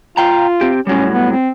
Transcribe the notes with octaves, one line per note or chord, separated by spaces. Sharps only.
F4 F5 G5 A#5
C4 G4
A2 F#3 G3 C#4
B3
C4